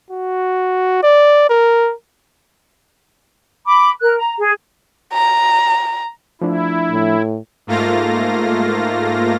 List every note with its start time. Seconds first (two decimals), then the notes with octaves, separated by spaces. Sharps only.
0.10 F#4
1.03 D5
1.50 A#4
3.66 B5 D6
4.00 A#4 F#6
4.17 A#5
4.37 G#4
5.13 A#5
6.41 F3 A3 D4 E4
6.91 A2
7.67 G#2 A3 A#3 F4 F5 A#6